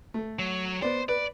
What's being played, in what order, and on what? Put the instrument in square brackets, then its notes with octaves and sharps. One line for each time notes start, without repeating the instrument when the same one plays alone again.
[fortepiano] A3
[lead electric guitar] F#3
[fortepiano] B3 D5 [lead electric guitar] C5
[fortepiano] B4 [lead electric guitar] D5